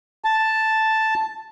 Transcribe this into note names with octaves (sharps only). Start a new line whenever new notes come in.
A5